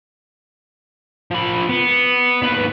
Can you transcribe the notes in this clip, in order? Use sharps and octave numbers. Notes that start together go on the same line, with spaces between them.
F3 B5
B3
D#2 B4